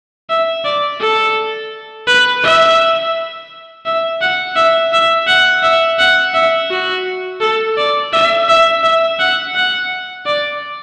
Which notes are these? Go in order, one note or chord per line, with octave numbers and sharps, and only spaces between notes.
E5
D5
A4
B4
E5
E5
F#5
E5
E5
F#5
E5
F#5
E5
F#4
A4
D5
E5
E5
E5
F#5
F#5
D5